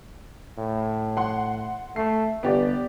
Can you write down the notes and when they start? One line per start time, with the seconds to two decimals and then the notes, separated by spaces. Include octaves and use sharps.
0.58 A2
1.17 F#5 C6
1.96 A3 C7
2.43 G1 B3 G4 D5